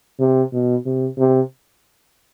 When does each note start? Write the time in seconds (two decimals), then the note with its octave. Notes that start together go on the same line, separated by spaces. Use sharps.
0.20 C3
0.53 B2
0.86 C3
1.18 C3